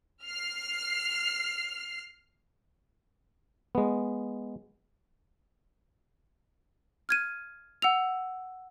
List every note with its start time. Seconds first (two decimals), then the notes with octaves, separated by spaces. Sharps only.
0.23 F6 C7
3.75 G#3 B3
7.09 F6 G#6 D#7
7.82 F#5 E6 F7